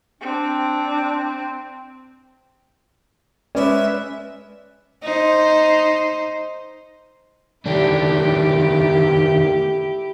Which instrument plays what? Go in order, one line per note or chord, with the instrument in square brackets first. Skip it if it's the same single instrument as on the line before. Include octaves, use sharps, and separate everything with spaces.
[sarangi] C4 [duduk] D4
[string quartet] G#3 E5 [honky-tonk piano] C#4 [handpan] B4 D5
[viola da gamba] D#4 C5
[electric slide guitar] D#3 A3 D4 [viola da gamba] E4 G4